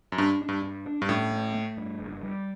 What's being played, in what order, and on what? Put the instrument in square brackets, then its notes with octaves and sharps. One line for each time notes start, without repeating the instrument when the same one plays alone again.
[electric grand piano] F#2
[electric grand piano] G2 [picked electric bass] D4
[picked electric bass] D4
[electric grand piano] G2
[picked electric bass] G2
D4
[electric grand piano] G2
[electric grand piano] A2 [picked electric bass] C#4
[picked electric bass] A3
A3
G2
F#1
G3